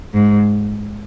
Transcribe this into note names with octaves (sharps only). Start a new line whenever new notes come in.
G#2